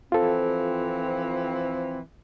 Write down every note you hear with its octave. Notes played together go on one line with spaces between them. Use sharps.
E3 F3 C4 F4 A4